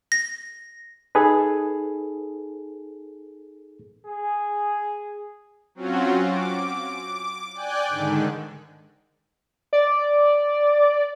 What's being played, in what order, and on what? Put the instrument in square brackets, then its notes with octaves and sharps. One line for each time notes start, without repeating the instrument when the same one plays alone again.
[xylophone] A#6
[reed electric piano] D#4 G#4 A4 B4
[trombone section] G#4
[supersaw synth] F#3 C4 C#4 F4 F#4
D6
D5 G5 G#5 F#6
G#2 D3 D#3
[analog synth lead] D5